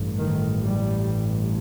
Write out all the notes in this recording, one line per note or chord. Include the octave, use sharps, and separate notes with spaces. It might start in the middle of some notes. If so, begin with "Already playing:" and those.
Already playing: A1 G2
D#3
G3